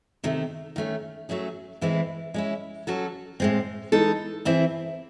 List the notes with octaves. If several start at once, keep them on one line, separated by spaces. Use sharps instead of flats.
C3 D#3 A3
D#3 A3 C#4
F#3 A3 C#4 G#4
A2 E3 G#3 C4 E4
G#3 C#4 E4
F#3 C#4 F#4 A4
A2 G#3 C4
E3 G#3 D#4 A4
E3 C4 E4 G#4